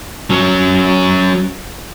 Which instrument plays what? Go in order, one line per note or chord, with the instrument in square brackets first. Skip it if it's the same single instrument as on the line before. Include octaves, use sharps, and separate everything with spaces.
[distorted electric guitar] F#3 C#4